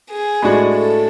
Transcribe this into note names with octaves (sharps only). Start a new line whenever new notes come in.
G#4
A2 G#3 D4 F#4
A4